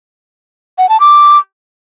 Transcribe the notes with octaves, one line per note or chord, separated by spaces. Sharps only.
F#5
A5
D6